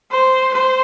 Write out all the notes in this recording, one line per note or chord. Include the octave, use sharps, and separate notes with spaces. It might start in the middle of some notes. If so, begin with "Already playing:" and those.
C5
C5